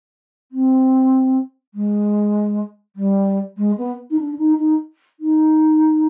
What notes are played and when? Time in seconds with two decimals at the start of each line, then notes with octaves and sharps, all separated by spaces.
0.52 C4
1.74 G#3
2.96 G3
3.57 G#3
3.78 B3
4.10 D#4
4.19 D4
4.38 D#4
4.59 D#4
5.20 D#4